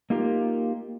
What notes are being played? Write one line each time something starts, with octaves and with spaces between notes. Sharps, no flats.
A#3 D#4 F4 G4 A#4